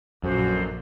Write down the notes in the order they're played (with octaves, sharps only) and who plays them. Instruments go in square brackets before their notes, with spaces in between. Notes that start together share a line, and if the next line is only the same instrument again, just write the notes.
[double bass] A#1 A#2 [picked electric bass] F#2 [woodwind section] A3 F#4 C5